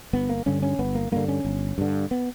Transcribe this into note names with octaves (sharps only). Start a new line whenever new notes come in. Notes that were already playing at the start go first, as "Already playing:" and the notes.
G1 B3
A#3
G2 D3 C#4
C#4
G1 B3
A#3
G2 D3 A#3
C#4
G1
G2 D3
B3